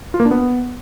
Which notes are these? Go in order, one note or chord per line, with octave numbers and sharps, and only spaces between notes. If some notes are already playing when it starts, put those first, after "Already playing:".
F4
A#3
D4
B3